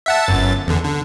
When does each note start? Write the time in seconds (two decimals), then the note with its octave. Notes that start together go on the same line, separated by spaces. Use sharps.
0.06 E5 F#5 A5
0.26 G1 F#2 A6
0.67 E2 D3
0.85 D3